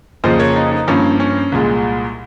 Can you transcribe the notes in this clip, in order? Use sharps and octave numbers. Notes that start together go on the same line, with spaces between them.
F2 C#3 F3 A#3 C5 D#5
A#4 C#5
D#4
D#4
G2 F3 A#3 C#4
C#4
C2 A#2 G#3